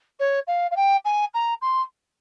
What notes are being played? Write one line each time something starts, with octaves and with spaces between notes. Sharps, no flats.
C#5
F5
F5
G5
G#5
A#5
C6